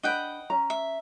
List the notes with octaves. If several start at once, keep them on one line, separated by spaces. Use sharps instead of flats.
D4 B4 D#5 F#5 G5
C#4 A#5
E5